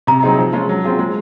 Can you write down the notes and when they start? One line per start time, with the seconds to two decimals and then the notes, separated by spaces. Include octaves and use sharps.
0.07 C3 A#5
0.23 F#3 C4 D#4 G#4
0.38 F3
0.53 G#3 C#4 F4
0.69 F#3
0.84 C4 F4 G#4
0.99 G#3